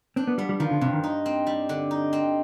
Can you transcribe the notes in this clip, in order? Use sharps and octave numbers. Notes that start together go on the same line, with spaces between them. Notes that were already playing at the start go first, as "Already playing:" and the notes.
C4 D4
B3
G3 B3
G3
D#3 F3
D3
G2 C3
D#3
D#4
C4
G3
D3
D#4
C4